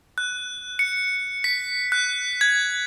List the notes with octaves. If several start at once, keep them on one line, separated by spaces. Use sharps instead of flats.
F#6
C#7
B6
F#6
G#6